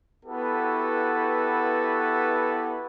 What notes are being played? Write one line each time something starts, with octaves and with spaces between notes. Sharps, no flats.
B3 E4 F#4 G4 A4 B4